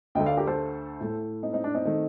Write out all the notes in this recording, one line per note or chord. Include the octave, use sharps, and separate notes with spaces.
D2 D3 A3 D#5 G5
D5 F5
G4 A#4
A4 C5
A2 A3
C4 D#4
C4 D#4
D4
C4 D#4
D#3 A3